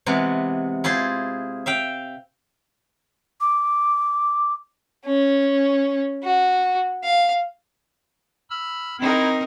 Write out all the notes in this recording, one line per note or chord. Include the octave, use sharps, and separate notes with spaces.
C3 E3 G#3 B3
E4 F4 G#4 C5
E5 F5 G5
D6
C#4
F#4
F5
B5 E6 F6
C4 D#4 E4 A#4